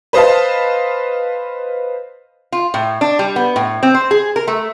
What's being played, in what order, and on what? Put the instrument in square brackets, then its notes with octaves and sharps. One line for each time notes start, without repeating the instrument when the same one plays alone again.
[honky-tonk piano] B4 C5 D#5 F5 A5
[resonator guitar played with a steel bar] F4
A2
D4
G3
B3
A2
C4
C5
G#4
A#4
A3